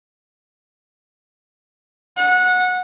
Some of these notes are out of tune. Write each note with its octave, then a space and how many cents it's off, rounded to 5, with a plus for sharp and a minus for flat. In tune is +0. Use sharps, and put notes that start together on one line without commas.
F#5 -20